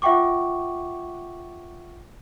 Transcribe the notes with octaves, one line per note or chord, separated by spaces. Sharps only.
F4 E5 F#5 G5 C#6 D6